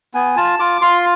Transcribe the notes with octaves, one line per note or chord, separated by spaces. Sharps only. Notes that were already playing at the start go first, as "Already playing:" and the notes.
B3 G#5
F4 A5
F4 D6
F4 C6